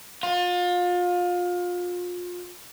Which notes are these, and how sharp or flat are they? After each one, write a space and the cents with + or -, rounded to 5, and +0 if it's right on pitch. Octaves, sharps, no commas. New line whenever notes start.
F4 +30